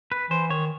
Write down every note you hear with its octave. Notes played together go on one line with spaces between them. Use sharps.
B4
E3 C5
D#3 C#5